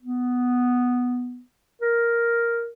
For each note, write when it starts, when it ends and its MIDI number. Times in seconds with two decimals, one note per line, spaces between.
0.02 1.42 59
1.82 2.67 70